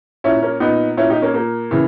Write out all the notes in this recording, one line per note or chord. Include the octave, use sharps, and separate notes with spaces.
A#2 C#4 E4
A#3 C#4
A#2 B3 D#4
A#2 C#4 E4
D#4 G4
A#3 C#4
A#2 A#3
C#3 E3